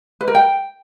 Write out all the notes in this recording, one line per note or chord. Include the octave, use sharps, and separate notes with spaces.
B4
A#4
G5